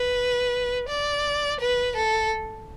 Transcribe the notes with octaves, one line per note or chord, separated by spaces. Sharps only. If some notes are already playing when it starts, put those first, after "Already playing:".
Already playing: B4
D5
B4
A4